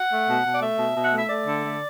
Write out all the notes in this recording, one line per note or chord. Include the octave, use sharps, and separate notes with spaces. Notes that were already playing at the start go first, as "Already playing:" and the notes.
Already playing: F#5
A3
B2
B2
D5
A3 E5
B2
B2
F#5
A3 E5
A3 D5
D3
A3